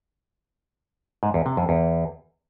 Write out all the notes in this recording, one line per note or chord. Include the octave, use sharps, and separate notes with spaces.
G#2
E2
C3
F2
E2